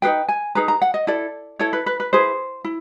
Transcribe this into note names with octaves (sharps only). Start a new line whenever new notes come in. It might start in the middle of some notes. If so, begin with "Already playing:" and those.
D#4 G#4 B4 G5
G#5
D#4 G#4 B4 A#5
A#5
F#5
D#5
E4 A4 D5
E4 A4 C#5
B4
B4
B4
E4 G#4 B4 C5
E4